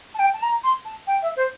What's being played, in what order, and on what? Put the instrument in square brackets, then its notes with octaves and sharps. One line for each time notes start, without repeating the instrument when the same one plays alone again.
[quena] A5
G5
A5
A#5
C6
A5
G5
E5
C5